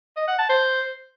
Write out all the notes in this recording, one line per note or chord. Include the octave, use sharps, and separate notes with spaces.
D#5
F#5
A5
C5